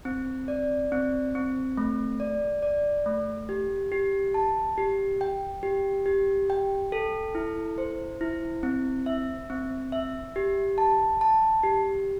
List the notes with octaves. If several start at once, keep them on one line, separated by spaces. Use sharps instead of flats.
C4
D5
C4
C4
A3
D5
D5
A3
G4
G4
A5
G4
G5
G4
G4
G5
A4
E4
C5
E4
C4
E5
C4
E5
G4
A5
A5
G4